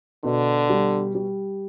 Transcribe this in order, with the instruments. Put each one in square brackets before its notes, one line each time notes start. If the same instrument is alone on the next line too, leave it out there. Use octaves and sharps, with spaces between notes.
[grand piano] B2 [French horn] D3
[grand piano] G3
G3